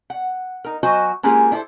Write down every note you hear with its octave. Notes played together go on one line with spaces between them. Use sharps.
F#5
D#4 A#4
F#3 F#4 C5 D#5 G#5
G#3 A#3 C#4 F4 G4 G#4
D4 E4 A4 C5